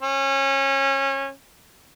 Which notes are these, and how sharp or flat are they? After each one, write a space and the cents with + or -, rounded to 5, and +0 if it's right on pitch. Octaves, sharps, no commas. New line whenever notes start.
C#4 -25